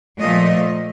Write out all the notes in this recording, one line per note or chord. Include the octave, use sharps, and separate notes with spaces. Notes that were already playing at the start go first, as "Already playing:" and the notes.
A#2 F3 A3 D#5